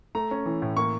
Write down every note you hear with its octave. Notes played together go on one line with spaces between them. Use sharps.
A3 A#5
C#4
E3
A2
A#3 C#6